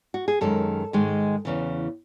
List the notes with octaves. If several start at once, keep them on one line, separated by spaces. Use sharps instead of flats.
F#4
G#4
F#2 D#3 G#3 A4
G#2 D#3 G#3
E2 C#3 E3